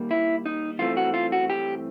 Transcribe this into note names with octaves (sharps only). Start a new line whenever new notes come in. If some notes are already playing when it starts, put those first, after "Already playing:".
Already playing: D#2 D#3 G3 A#3
E4
D#4
G2 E3 A3 C4 F4
F#4
F4
F#4
G4